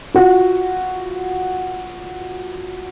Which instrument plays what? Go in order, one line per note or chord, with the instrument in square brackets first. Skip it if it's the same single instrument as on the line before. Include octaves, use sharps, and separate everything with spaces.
[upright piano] F4 F#4